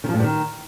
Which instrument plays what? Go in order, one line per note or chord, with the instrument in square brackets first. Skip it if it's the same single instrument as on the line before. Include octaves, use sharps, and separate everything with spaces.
[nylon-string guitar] D#3
F3
A2
G2
D#3